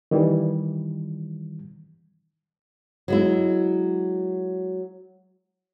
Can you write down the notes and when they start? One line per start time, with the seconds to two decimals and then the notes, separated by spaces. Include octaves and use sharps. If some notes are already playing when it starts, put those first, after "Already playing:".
0.11 D#3 E3 G3
3.08 F#3 G#3 E4